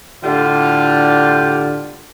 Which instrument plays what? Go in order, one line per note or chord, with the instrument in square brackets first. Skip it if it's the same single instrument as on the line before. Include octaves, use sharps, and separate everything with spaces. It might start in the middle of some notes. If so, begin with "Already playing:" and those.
[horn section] A2 D3 G3 F4